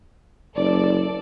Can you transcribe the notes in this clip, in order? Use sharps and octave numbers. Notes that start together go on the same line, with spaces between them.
F#1 A4 D5